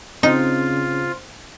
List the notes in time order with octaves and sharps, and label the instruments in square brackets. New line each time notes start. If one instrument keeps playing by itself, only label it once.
[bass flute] C#3 [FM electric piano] C4 C5 [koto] D#4 [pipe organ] F4